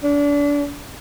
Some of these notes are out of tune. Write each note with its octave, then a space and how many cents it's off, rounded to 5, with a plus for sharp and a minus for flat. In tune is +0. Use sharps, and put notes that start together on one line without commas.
D4 -30